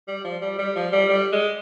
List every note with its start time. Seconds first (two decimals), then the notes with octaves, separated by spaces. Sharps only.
0.08 G3
0.25 F3
0.42 G3
0.59 G3
0.76 F3
0.93 G3
1.09 G3
1.32 G#3